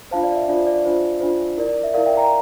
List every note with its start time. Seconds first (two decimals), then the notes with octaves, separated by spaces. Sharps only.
0.11 D4 F4 C5 F5 A5
0.23 D5 F5
0.36 E5
0.48 D4 F4 C5 D5
0.67 D5
0.85 D4 F4 C5
1.21 D4 F4 C5
1.58 E4 A#4 D5
1.83 E5
1.94 E4 A#4 D5 F5
2.05 E5 G5
2.17 G5 A#5